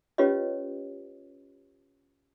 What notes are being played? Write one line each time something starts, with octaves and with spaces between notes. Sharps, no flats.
C#4 F4 G4 B4 C#5 D#5